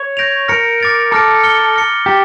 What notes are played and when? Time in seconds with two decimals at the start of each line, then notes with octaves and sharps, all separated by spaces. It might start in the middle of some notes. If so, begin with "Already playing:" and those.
Already playing: C#5
0.17 G6 A#6 D7 F7
0.48 A#4 F6 A#6 C#7
0.80 D6 A6 D7
1.11 A4 A#5 D6 F6 A#6 D7
1.43 F6 C#7 G7
1.76 F6 A#6 C#7 G7
2.06 G4 A#5 D6 A6